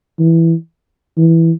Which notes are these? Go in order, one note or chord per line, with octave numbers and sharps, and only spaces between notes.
E3
E3